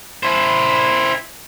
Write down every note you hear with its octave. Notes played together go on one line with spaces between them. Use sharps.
E4 C5